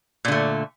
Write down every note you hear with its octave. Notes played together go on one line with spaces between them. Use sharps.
A#2 D3 A3